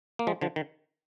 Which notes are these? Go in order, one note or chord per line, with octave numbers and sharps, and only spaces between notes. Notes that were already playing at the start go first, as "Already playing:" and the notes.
A#3
F3 G#3
D3 F3
D#3